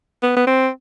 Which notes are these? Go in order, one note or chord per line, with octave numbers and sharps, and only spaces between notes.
B3
B3
C4